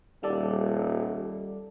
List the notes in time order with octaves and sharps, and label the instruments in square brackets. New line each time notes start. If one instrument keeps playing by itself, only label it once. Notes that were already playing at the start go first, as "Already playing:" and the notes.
[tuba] D#1 [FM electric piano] G3 A4 D5